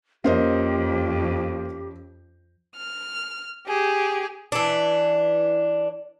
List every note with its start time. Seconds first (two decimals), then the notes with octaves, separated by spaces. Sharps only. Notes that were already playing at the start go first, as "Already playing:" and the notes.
0.24 F2 A#3 C#4 G4 C5 D#5
2.76 F6
3.68 G4 G#4
4.52 E3 D4